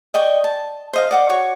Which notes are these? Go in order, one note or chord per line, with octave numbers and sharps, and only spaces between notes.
D5 D#5 G5 C#6
A5
C5 D#5 F5
D5 F#5 D6
F#4 C#5 C#6